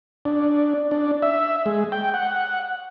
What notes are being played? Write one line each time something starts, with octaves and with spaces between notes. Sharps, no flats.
D4
D4
E5
G#3
G5
F#5